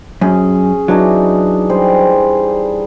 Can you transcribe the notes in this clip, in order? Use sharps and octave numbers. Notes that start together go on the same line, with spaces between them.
F#2 C#4 G#4
E3 F#3 D4 D#4
G3 G#4 C5